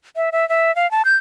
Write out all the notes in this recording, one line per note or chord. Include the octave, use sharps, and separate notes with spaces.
E5
E5
E5
F5
A5
G6